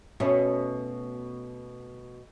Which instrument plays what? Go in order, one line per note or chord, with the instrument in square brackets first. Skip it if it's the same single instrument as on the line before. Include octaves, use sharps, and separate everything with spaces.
[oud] B2 [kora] A3 C#4